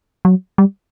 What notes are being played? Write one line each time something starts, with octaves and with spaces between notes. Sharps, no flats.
F#3
G3